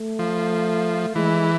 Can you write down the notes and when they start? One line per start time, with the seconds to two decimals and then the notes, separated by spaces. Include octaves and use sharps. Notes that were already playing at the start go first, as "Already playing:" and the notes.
Already playing: A3
0.19 F3
1.15 E3 G#3